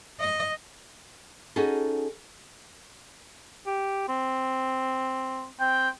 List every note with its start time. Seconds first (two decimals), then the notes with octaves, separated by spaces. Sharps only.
0.20 D#5
1.56 C#4 D#4 F#4 G#4 A4
3.66 G4
4.08 C4
5.60 C4 G5